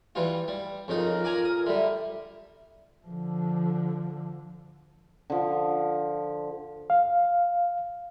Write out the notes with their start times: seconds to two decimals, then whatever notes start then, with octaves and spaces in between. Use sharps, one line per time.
0.15 E3 G3 F4
0.48 G3
0.88 F2 C#3 D#4 F4 A#4
1.24 D5 G#5 A#5
1.45 D#6
1.66 D3 G3 E5
3.07 D3 F3
5.30 D3 F3
6.90 F5